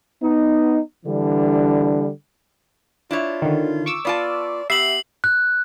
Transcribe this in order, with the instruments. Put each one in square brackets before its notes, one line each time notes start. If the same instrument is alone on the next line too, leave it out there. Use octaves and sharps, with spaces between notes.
[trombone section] B3 D#4
D3 E3 G3 D4
[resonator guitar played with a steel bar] D4 E4 C#5 [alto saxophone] F4
[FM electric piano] D3 D#3
C#6 D6 E6
[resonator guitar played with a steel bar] B3 F4 A5 [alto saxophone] D5
[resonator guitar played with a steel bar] B3 [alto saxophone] G4 [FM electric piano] E5 [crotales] C7 F#7
[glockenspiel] F#6